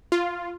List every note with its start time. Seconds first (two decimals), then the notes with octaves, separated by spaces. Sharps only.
0.12 F4